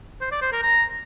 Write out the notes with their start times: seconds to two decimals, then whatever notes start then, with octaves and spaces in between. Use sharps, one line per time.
0.21 C5
0.31 D5
0.42 C5
0.52 A#4
0.63 A#5